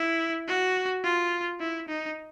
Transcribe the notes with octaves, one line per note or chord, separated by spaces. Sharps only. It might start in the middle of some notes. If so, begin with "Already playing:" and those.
Already playing: E4
F#4
F4
E4
D#4